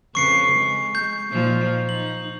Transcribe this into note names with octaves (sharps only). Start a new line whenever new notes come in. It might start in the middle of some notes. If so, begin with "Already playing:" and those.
F2 C#3 B4 C#6 C7 C#7
G#3
G6
A#2 F3 D#4
D#4 F#7